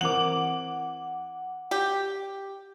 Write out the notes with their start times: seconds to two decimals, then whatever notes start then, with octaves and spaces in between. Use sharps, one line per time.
0.01 E3 C4 A#4 F#5 D6 F#7
1.71 G4